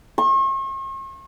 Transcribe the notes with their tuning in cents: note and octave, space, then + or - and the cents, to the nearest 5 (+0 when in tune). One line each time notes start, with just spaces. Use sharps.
C#6 -45